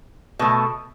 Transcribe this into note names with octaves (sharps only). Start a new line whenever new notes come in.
B2 A3